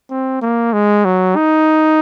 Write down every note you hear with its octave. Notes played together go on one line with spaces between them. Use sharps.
C4
A#3
G#3
F#3
D#4